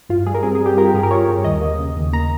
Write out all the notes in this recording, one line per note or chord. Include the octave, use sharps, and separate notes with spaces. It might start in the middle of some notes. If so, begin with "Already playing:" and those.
G2 F4
G3 G#4
A#4
C4 G#4
G#4
G3
G4
F4 A#4
G4
G2 G#4
A#4
F4 C#5
G2
D#2 D#5
A#3
C#3
D#2
A#3 A#5